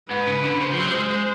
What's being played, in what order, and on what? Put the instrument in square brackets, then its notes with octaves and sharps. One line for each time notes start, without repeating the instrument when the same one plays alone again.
[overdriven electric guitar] G#2 [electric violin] B4
[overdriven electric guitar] C#3
D3
[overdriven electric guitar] C#3 [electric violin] C5
[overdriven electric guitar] F3
F#3
G3
G#3
G#3